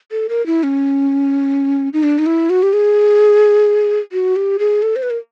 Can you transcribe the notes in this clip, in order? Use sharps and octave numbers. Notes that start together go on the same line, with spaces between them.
A4
A#4
E4
C#4
D#4
D4
D#4
E4
F#4
G4
G#4
F#4
G4
G#4
A4
C5
B4
A#4